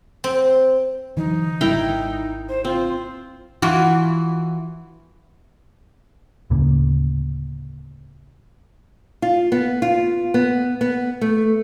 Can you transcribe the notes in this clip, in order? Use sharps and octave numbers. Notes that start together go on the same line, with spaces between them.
C4
D3 E3 F#3 D#4
G#1 G3 D4 E4 A#4 G5
C5
C4 F4
E3 F4 F#4
D2 A2 C#3 A#3
F4
B3
F4
B3
B3
A3